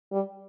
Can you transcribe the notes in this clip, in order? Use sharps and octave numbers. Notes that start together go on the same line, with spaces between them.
G3